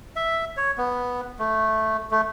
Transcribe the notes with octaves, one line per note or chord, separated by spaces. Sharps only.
E5
C#5
B3
A3
A3